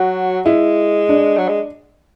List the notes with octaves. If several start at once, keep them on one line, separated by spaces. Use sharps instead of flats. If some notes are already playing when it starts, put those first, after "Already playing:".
Already playing: F#3 F#4
G#3 E4
D4
F#3
G#3